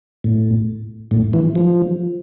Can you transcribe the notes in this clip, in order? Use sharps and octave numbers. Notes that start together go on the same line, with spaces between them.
A2
A2
E3
F3